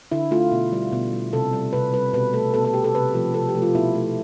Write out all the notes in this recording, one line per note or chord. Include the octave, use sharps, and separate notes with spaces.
D3 E4
A3 F4
B2
G3
B2
G3
C3 A4
G3
C3 B4
G3 B4
B2 B4
A3 A4
B2 A4
A4
A3 G4
A4
C3 B4
F3 A3
C3 A4
G4
F3 A3
F4
B2 E4
A3